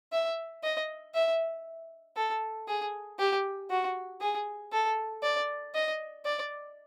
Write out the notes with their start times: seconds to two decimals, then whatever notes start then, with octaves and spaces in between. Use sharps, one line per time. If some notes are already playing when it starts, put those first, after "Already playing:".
0.13 E5
0.64 D#5
1.15 E5
2.17 A4
2.68 G#4
3.19 G4
3.71 F#4
4.21 G#4
4.72 A4
5.23 D5
5.75 D#5
6.26 D5